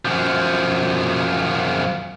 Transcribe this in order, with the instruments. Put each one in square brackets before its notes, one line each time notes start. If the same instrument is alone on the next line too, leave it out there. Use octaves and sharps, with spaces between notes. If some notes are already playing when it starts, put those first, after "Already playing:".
[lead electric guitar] F#2 F3